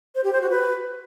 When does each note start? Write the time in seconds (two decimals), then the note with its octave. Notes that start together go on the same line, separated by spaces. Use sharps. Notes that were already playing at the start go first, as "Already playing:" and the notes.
0.15 C5
0.24 G4
0.33 C5
0.41 F#4
0.50 B4